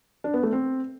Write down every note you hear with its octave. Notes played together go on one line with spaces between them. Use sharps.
D4
B3
A3
C4